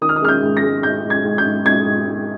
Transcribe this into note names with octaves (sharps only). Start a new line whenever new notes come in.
D#3 D#6
F6
D#6
G#3 F6
G6
G#2
A#6
G#3
G#2 G6
G#2
G#6
G#2
G6
G#2
G#2 G#6
G#2
G#2